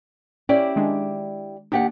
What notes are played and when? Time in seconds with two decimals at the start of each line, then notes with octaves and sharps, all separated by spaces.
0.49 C#4 E4 G4 D5
0.76 D#3 G#3 D4
1.72 D#2 D4 G4 F#5